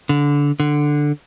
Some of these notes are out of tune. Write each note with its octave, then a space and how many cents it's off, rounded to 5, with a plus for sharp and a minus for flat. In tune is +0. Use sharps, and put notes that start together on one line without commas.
D3 -20
D3 +5